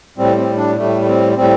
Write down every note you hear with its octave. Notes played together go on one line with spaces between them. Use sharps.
A2 G3 C4
C4
D4
A2 G3 A3
A3
C4
A2 G3 C4